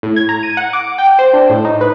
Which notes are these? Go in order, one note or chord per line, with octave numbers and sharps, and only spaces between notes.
A2
G#6
A#5
D#7
F#5
D6
G5
C5
D4
A2
D#4
B4